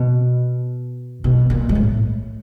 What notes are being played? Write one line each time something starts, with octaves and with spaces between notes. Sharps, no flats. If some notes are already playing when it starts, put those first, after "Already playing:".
Already playing: B2
B2
A#2
G#2
A2